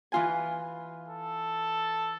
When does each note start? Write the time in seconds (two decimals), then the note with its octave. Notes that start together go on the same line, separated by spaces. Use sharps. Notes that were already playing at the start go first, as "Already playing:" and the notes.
0.12 E3 F4 G#5
1.08 A4